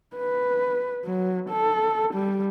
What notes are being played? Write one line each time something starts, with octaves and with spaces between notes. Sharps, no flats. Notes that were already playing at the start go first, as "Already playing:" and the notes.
B4
F#3
A4
G3